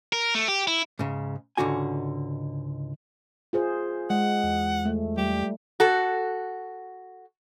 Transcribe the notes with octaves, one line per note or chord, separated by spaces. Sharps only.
A#4
A3
G4
E4
G#2 C#3
C#2 G#2 D3 F#4 G#5
F4 G#4 C5
G#3 F#5
E2
A3
G3 G4
F#4 A4